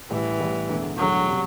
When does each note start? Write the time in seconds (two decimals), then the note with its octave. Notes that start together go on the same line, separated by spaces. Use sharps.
0.10 A1 A2 E3 G3
0.40 A1 A2 G3
0.69 E1 E2 D3 A3
0.98 E1 E2 D3 F#3 A3
1.28 C3 G3